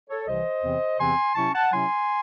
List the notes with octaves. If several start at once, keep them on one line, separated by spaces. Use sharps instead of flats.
A4 C#5
C2 C3 E3 C5 D#5
E2 C3 E3 C4
E2 C3 E3 C4 G#5 C6
C3 F#3 C#4 E4 A5 C#6
F#5 A5
C3 F#3 C#4 E4 G#5 C6